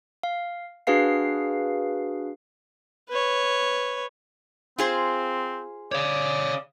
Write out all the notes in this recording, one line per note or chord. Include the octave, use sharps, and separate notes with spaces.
F5
D4 F#4 G#4 B4 F5 C7
B4 C#5
C4 F4 G#4 C5
C#5 D5 F5